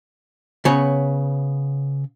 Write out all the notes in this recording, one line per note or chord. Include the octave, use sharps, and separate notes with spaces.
C#3 B3 C#5